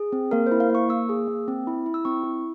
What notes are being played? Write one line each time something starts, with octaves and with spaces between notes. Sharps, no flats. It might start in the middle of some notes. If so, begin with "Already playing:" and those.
Already playing: G#4
C4
A#3 A#4
E4 C5
F5
A#3 C#6
A#3 E6
G#4
A#3
C4
E4
E4
E6
C4 C#6
E4